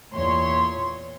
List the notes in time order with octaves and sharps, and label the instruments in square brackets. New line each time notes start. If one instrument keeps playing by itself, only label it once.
[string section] E2 A#2 C#5 C6